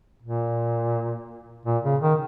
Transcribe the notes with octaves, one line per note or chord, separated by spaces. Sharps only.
A#2
A#2
C#3
D#3